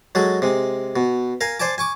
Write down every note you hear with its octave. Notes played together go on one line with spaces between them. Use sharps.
F#3 G#3 G#4 A4
C3 G#3
B2
A#4 F5 G#5
C5 D5 G#5 A5 D6
G#5 C#6 D6